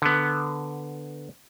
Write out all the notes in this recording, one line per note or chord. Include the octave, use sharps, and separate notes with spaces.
D3 B3